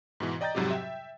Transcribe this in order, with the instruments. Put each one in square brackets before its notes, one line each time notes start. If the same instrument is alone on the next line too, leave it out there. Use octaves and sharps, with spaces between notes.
[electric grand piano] G#2 B2 E3
D5 D#5 G5 A#5 G6 A6
F2 G#2 C3 F#3 G3 G4
E5 G5